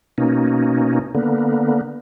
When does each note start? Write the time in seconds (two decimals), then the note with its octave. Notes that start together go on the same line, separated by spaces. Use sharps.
0.18 B2 A#3 C#4 D#4
1.15 D3 A#3 B3